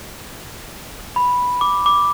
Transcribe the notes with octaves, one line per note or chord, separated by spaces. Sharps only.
B5
D6
D6